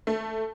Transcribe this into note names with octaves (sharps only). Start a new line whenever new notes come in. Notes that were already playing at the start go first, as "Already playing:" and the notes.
A3